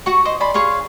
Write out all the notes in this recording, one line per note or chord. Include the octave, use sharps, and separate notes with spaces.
F#4 F#5 C#6
C5 D#5
D5 G#5 B5 C6
G#4 C#5 F5 C6